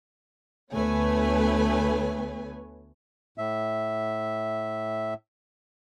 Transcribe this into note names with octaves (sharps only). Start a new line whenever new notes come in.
D2 A3 B3 B4 C#5 G#5
A2 E5